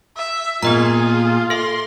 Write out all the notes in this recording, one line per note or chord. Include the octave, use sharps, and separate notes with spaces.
E5
A#2 B3 F4 G#4 D#5 A#5
A4 E5 C6